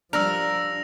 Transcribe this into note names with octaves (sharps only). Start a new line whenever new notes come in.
F3 G3 D4 A#4 E6 A#6 F7